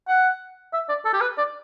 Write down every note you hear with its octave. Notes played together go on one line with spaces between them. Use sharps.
F#5
E5
D5
A4
G4
B4
D5